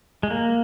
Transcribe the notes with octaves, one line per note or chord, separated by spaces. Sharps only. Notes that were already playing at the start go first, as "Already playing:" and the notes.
G#3
A#3